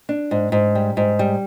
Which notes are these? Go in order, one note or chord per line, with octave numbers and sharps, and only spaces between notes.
D4
G#2
G#2
G3
G#2
G3